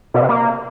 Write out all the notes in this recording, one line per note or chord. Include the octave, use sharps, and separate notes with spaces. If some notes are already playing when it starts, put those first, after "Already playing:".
B2
C3
A#3